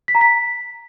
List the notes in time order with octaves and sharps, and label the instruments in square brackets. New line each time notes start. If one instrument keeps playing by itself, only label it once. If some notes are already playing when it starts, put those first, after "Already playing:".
[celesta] B6
A#5
B6